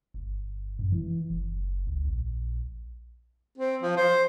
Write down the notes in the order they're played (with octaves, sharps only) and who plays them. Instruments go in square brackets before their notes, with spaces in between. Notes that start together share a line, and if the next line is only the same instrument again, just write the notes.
[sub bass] G1
F#2
E3
F#1
C#2
A#1
[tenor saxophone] C4
F3
C5